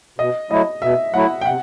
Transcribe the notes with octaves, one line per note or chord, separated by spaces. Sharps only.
B2 D#5
F#3 A3 E4 D#5
B2 E5
F#3 A3 E4 F#5
G5
C3 F#5